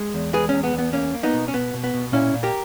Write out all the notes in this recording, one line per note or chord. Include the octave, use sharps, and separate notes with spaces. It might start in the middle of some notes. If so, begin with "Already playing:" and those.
Already playing: G#3
E2
G#3 G#4 B4
E2 C#4
B3
E2
B3
A#3 C#4
A#3
B3 D#4
B2
C#4
B2 B3
B2
B3
B2
A#2 C#4 E4
A#2
G4 A#4